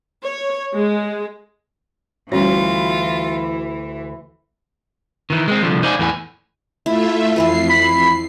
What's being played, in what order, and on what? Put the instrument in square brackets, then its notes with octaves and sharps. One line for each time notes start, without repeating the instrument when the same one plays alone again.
[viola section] C#5
G#3
[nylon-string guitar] D2 F#4 [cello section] E3 [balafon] G3 C#4 C#5 [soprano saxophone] F4
[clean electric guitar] D#3 E3
G#3 C4
C2 D3 F3
D#4 C5 D5 F5 G5 G#5
E2 A2 E3 G#4 G#5
[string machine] A3 F4 E5 [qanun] E4
[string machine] F2 C7 [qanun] E3 E4 B4
[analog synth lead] B5